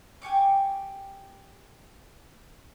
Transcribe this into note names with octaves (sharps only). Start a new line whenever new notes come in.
G4 G#5 C#6 D6